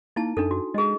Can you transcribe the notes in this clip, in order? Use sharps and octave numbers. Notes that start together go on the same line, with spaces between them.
A#3 D#4 E4 A5
F#2 D4 D#4 A4
F#4
G#3 G#4 D#5